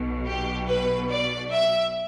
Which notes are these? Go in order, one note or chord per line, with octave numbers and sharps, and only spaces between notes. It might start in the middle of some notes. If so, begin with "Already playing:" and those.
Already playing: B1 B2
G4
B4
D5
E5